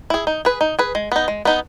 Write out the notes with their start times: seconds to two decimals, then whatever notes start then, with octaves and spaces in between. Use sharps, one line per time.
0.10 E4 G#4
0.27 D#4
0.45 G#4 B4
0.61 D#4
0.79 G#4 B4
0.95 G#3
1.12 B3 D#4
1.28 G#3
1.45 B3 D#4